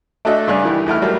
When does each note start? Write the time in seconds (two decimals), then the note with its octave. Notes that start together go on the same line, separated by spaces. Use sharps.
0.25 A3 D4 F#4 A4 D#5 E5
0.47 G2 C#3 D4 G#4 D5 F#6
0.63 D#3 E3 G4
0.86 E2 E3 A3 F6
1.02 F#3 G3 A3 A#3